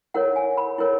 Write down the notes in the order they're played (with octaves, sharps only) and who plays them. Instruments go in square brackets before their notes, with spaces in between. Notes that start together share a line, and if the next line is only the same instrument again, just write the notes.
[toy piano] E4 A#4 C#5 F#5
G#5
B5
E4 A#4 C#5